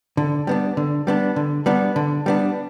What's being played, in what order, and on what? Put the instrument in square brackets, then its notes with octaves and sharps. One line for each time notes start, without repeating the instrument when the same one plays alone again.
[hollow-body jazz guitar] D3
G3 B3 D4
D3
G3 B3 D4
D3
G3 B3 D4
D3
G3 B3 D4